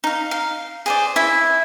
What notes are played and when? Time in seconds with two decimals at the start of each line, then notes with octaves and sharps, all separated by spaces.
0.04 D#4 F5
0.31 F5
0.86 G#4 C5 D5
1.16 E4 E5